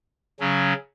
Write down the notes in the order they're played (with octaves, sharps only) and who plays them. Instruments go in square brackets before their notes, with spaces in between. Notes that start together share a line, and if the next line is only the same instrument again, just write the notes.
[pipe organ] C#3 F#3 C#4